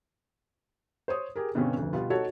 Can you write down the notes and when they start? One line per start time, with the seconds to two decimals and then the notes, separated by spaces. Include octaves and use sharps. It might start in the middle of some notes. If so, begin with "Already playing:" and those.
1.08 C5 C#5 D#6
1.36 G4 G#4 A#4
1.55 G2 B2 D3 C4 C#4
1.77 F1 D2
1.93 B2 G3 B3 F4
2.10 D#4 F#4 A4 C#5